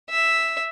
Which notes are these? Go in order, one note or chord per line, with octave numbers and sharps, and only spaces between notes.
E5